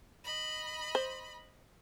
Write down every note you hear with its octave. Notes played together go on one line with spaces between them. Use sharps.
D#5 B5
C5